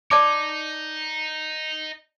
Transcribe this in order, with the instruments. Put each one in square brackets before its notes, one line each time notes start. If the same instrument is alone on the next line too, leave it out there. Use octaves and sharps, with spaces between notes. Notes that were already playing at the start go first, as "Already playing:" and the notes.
[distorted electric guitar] D#4 [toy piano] D5 A5 D6